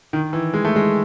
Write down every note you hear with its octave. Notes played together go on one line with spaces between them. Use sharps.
D#3
E3
G#3
A3
G#3